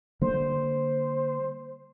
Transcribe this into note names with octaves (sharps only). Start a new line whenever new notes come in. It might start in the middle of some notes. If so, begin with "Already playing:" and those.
D3 G3 A#3 C5